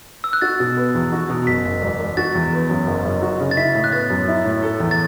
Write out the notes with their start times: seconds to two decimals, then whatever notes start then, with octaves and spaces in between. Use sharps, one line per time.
0.24 E6
0.33 F#6
0.41 F#4 A6
0.60 B2
0.77 B3
0.95 E2
1.12 F#4
1.30 B2
1.47 F#1 B6
1.65 F#1
1.82 E1
2.00 E1
2.17 F#4 A6
2.35 E2
2.53 B3
2.70 F#2
2.87 F#1
3.05 F#1
3.22 F#4
3.40 C#3
3.51 A6
3.57 E4 B6
3.75 A2
3.84 F#6
3.92 B3 A6
4.10 F#2
4.28 E4
4.45 A2
4.63 A4
4.80 E2
4.91 A6